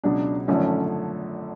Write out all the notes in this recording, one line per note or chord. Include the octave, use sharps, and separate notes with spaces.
C#2 B2 F#3 D4
G#1 F#2 D3 F3 A3 C#4